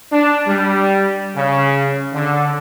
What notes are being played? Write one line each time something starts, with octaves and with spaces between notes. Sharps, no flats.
D4
G3
C#3
D3